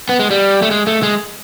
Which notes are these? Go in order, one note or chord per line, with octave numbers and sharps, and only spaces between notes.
B3
G#3
G3
A3
G#3
A3
G#3